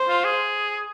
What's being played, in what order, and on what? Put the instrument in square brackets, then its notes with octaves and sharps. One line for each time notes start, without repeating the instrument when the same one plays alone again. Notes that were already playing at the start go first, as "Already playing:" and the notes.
Already playing: [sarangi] C5
[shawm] F4
G#4